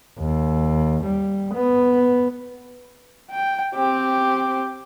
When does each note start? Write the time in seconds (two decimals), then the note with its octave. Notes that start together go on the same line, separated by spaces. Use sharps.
0.19 D#2
1.04 G3
1.55 B3
3.31 G5
3.74 C4 G4